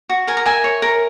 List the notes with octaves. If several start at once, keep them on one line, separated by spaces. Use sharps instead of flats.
F#4
A#4 G#5
A#5
A#4 E5 G#5
C#5
A#4